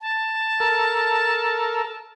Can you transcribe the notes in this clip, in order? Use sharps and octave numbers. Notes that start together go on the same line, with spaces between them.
A5
A4 A#4